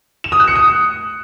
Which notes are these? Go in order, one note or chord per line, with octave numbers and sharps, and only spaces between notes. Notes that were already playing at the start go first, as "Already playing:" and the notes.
E7
D#6
F#6
C#7
D#6